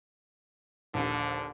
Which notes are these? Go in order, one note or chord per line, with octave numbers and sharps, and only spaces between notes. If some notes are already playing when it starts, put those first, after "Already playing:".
A#1 D#2 D3